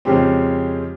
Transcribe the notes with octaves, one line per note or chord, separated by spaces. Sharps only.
F2 C#3 G#3 C4 G4